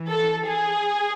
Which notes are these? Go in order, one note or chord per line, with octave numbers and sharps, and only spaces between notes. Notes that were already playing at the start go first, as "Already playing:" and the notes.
Already playing: E3
A4
G#4